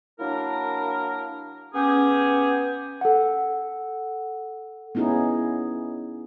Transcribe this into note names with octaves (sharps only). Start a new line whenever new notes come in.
F#3 A#3 D4 E4 A#4
B3 C#4 G4 G#4
A4 F#5
B3 C#4 D#4 E4 G#4